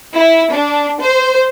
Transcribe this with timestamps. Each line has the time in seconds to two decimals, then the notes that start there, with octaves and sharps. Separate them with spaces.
0.14 E4
0.53 D4
1.01 C5